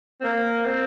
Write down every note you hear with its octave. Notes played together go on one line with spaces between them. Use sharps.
C4
A#3
C4